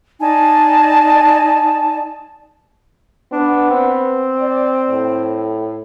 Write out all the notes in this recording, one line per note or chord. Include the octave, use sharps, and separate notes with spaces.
D#4 D5 G#5 A5
B3 D4
C4
D5
A2